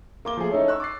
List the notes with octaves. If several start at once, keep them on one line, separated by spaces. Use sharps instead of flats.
A#3 D6 G7
F3 A3 G#4
C#4 D#4 E4 A4 C#5
C#6 E6 F#6
D6 A6 C7